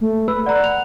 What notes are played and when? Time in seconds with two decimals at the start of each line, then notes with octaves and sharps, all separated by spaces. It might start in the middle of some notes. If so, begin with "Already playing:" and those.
0.01 A3
0.28 B4 E6
0.46 D5 F#5 A#5
0.64 F7